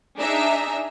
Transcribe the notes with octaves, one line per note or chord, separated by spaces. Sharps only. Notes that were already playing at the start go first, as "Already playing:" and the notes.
D4 D#4 G#4 E5 A#5